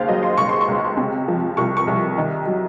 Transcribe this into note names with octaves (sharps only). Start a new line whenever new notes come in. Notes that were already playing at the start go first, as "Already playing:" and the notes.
Already playing: D#2 C#3 C5 F5
F#3 D#5
C6
C#2 C#6
C6
C#6
C#2
C3
F3
C2 C#6
C#6
C2
D#3
F#3